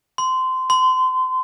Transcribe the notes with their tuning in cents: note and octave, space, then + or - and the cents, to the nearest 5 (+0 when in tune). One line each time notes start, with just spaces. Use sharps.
C6 -20
C6 -30